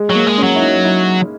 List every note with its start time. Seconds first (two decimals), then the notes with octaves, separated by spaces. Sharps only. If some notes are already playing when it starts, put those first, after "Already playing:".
Already playing: G#3
0.10 F#3
0.15 A#3
0.27 G#3
0.38 C#4
0.43 F#3
0.55 E4
0.61 D#4
0.83 E4